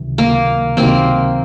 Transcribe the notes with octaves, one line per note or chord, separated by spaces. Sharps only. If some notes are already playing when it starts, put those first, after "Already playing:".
Already playing: C#2 C3 D#3 F#3
C#2 C3 D#3 F#3 A#3
C#2 C3 D#3 F#3 A#3 C4